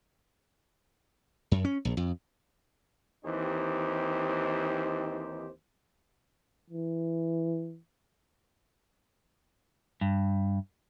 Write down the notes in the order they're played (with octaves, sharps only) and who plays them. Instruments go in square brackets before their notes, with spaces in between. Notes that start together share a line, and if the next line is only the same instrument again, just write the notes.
[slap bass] F#2
C#4
A#1
F2
[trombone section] D#2 E3 C4 D#4 G4 C5
[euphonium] E3
[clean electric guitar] G2